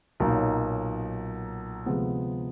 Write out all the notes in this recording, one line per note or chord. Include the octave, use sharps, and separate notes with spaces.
B1 A#2 F#3 A#3 D#4
D2 C3 F3 G#3 B3